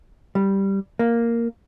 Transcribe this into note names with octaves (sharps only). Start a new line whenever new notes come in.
G3
A#3